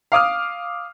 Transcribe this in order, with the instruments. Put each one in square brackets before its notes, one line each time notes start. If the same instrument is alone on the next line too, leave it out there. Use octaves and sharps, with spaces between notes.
[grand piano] F5 D6 D#6 F6